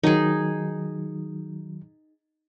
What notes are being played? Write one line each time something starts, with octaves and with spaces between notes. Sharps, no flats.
D#3 F#3 D#4 G#4